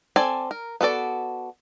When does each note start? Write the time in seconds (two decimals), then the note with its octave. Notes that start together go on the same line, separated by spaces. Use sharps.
0.16 C4 A4 D5 G#5
0.51 A#4
0.81 B3 F#4 A4 D5